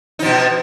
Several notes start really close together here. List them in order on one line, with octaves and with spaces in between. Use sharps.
D#4 F3 B2